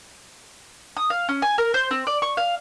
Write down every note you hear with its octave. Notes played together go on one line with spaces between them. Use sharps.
D#6
F5
C#4
G#5
A#4
C5
C4
D5
C#6
F5